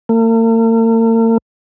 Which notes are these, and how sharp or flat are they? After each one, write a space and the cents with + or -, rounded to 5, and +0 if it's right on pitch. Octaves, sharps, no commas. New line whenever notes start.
A#3 -45